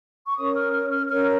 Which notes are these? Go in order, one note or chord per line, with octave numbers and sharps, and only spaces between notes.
C#6
C#4 A#4 C#5 D#6
F6
F6
F6
C#4 A#4 C#5 F6